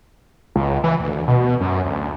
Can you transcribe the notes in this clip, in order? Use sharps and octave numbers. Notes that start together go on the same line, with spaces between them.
C#2
E3
D2
B2
F#2
D2